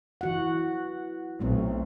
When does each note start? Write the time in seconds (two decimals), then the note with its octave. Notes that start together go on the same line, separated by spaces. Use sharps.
0.21 E3 F#4 F#5
1.41 B1 A3 C4